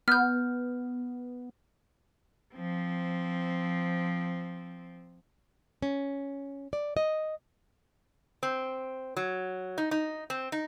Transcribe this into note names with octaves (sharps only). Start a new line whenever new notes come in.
B3 F6 G6
F3 C4
C#4
D5
D#5
C4
F#3
D#4
D#4
C4
D#4